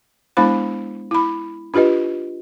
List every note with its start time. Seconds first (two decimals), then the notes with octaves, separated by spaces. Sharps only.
0.37 G#3 B3 D4 E4 C5 B5
1.11 E4 B5
1.74 D4 F4 G4 B4 D#5